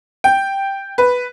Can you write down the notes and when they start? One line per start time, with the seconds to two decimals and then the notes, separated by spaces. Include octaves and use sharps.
0.24 G5
0.98 B4